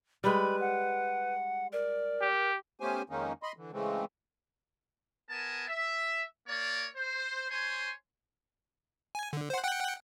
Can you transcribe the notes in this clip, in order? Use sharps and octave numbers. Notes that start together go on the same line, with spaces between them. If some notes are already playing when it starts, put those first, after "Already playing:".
G3 G#3 B4 B5
F#5
A#4 D5
G4
A3 B3 C#4 G4 C5 G#5
F2 D#3 G#3 A#3 C#4 D#4
D#5 B5 C6
D3 E3
C#3 E3 G#3 A3 C4
B3 A#4 G#5 A5
E5
A#3 C#5 D5
C5
C5 C#5 G#5 C6
G#5
D3
C5 F#5
F#5 G5 F#6